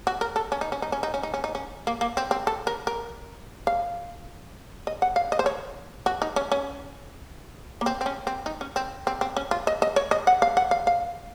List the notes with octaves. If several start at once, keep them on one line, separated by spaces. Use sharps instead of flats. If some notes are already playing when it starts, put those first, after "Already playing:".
F#4
A#4
A4
C#4
D#4
C#4
D#4
C#4
D#4
C#4
D#4
C#4
D#4
C#4
A#3
A#3
C4
C4
A4
A#4
A#4
F5
D#5
F#5
F5
D#5
C5
C#5
F#4
D#4
C#4
C#4
A#3
C4
C4
C#4
C4
D#4
C#4
C4
C4
C4
C#4
F4
D#5
D#5
C#5
D#5
F#5
F5
F#5
F5
F5